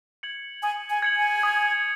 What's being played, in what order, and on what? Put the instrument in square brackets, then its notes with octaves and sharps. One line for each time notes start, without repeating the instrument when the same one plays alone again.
[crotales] G#6 C#7 F#7
[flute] G#5 [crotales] D#6
[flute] G#5
[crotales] G#6 C#7 F#7
[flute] G#5
[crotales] D#6